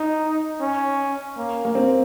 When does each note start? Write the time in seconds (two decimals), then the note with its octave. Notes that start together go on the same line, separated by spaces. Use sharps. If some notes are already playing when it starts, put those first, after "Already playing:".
Already playing: D#4
0.61 C#4
1.37 A#3
1.65 A#3
1.75 C4